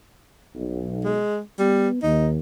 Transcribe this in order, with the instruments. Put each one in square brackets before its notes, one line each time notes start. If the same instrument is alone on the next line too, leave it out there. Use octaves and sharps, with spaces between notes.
[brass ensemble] B1
[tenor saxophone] G#3
[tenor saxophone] G3 [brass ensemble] B3
[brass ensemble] D#2 [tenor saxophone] D#4